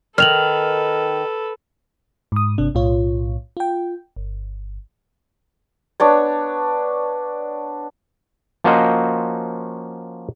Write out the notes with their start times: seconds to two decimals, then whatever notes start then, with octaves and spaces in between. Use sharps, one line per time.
0.18 D#3 A4 B4 F6 F7 F#7
2.32 G#2 D#6
2.58 G1 C3 D4
2.75 B1 A2 F4 C#5
3.57 F4 G5
4.16 G1
6.00 B3 D4 C#5
8.64 F3 A#3 C#4 F#4 C5 D#5